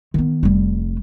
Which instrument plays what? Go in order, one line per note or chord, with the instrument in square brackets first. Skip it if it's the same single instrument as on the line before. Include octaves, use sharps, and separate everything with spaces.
[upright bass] D#3 B3
F1 G3